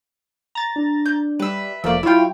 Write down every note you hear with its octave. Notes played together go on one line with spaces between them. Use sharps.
A#5 A6
D4
G6
G3 B4 E5
F1 F3 A3 A#3 D5 E5
F#3 E4 F4 C#5 G5